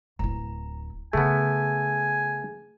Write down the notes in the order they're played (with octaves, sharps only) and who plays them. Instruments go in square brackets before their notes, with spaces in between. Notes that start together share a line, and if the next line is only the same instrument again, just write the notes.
[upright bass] D1 E4 [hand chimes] A#5
[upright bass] C#3 [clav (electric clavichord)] A3 B3 [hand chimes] G#4 [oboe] G#5